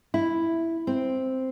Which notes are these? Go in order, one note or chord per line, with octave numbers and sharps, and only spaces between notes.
E4
C4